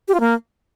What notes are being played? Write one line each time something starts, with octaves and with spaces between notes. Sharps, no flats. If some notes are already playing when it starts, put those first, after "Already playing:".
G4
F4
A#3